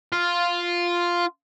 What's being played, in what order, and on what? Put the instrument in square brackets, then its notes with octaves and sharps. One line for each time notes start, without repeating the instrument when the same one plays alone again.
[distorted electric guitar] F4